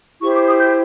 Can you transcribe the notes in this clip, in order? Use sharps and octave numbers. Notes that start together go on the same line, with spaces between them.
E4 G4 C5 C#6
D6
D#6
G6